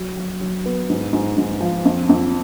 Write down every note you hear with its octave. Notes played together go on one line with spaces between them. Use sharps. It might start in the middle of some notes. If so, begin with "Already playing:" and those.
Already playing: F#3
F#3
F#3
B3
G#2
G#2
G#2
F3
F2
F2